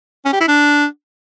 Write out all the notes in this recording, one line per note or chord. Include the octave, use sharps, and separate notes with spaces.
C#4
G4
E4
D4